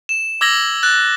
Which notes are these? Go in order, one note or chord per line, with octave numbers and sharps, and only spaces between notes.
E7
D6 E6 G#6 A#6 F#7 G7
F#6 A6